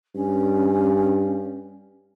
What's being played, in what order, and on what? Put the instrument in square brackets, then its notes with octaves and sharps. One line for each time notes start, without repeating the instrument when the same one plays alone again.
[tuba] G2 [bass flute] C#4